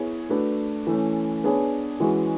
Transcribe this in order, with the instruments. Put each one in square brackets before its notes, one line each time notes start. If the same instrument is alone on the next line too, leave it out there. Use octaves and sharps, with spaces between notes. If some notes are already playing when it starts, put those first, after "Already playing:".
Already playing: [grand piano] B3 E4 G#4 C#5
A3 D4 F#4 B4
E3 A3 C#4
B3 D4 G#4 C#5
E3 G#3 C#4 F#4 B4